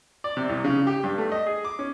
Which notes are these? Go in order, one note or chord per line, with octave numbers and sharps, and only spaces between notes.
D5
C3
C2
C#3
G4
G2
A3
D#5
G#4
D6
C#4